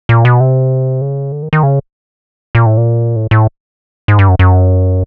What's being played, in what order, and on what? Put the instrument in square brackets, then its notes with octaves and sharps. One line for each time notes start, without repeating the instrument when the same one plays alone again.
[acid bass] A#2
B2
C3
C#3
D3
D#3
D#3
C#3
A#2
A2
A#2
A2
A2
G#2
G2
F#2
F#2